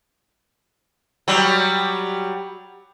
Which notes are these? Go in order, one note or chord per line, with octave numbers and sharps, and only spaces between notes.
F#3 G3